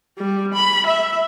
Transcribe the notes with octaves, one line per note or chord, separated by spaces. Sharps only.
G3
B5
E5